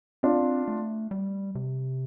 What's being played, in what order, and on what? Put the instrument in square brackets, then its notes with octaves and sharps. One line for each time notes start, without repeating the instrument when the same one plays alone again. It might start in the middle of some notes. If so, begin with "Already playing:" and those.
[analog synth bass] C4 [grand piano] D4 F4
[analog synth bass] A3
G3
C3